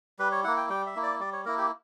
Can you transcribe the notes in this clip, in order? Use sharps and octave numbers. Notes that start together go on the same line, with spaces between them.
G3 B4
C#5
A#3 E4 F#5
G5
G3 G5
E5
A#3 E4
D5
G3 D5
C#5
A#3 E4 A#4
G4